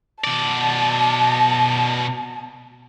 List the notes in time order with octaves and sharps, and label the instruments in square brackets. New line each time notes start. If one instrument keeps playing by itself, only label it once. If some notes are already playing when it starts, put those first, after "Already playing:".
[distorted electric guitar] B2 D5 [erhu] A5